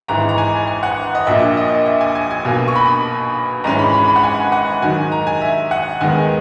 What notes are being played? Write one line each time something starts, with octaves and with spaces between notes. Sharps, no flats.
G#1 G#2 E3 A#5
A#5
G#5
G#5
F#5
D#5
A#1 A#2 A#3 E5
D#5
E5
G#5
G#5
G#5
B1 B2 A#3
C#6
B5
G#1 G#2 E3 G#3 C#4 A#5
B5
B5
B5
F#5
G#5
F#5
G#2 D#3 F#3 G#5
A#5
G#5
E5
F#5
D#2 D#3 G#3 B3 G#5